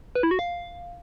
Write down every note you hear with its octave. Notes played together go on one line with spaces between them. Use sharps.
B4
E4
F#4
F5